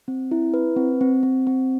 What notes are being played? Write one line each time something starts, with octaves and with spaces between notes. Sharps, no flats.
C4
E4
B4
C4
C4
C4
C4